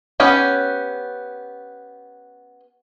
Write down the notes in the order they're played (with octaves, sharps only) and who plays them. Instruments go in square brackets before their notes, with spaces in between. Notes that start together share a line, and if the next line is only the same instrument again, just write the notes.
[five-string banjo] B3 C#4 G4 G#5